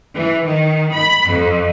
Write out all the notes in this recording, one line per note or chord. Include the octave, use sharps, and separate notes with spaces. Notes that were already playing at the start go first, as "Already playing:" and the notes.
E3
D#3
B5
F2